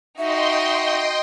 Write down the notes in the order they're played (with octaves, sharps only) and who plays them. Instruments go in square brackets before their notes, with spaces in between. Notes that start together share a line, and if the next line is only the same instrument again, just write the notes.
[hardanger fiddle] D#4 F#4 [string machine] D#5 G5 C6 [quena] E5